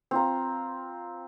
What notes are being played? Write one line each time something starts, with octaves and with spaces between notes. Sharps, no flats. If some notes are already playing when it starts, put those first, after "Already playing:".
C4 F4 A#5